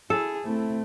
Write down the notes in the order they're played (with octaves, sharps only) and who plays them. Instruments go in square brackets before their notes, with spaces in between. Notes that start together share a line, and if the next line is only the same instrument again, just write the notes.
[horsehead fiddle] E4 G#4 [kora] A4
[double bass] A3 C4 [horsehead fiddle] E4